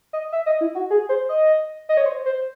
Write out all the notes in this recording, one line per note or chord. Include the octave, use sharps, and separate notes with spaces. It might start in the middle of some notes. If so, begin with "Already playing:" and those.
D#5
E5
D#5
E4
F#4
G#4
C5
D#5
D#5
C#5
C5
C5